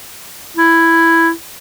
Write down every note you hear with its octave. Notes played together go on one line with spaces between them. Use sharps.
E4